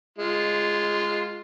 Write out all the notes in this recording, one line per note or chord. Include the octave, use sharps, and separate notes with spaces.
G#3 F4